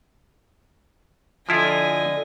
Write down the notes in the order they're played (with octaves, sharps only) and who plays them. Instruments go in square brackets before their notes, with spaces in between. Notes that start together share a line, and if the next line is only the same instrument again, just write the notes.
[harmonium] D3 [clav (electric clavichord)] F3 E4 F4 [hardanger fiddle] D#5 G#5